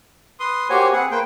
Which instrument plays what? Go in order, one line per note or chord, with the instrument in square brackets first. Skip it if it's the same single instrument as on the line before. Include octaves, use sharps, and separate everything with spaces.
[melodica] B4 [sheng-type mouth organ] C6 D#6
[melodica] A#3 F#4 G4 [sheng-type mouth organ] C5 C#5 G#5
[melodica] C4 B4 [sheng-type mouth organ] G#4 F#5
[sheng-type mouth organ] A#3 G5 [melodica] B4 C5